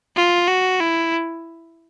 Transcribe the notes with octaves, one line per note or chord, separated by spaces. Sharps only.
F4
F#4
E4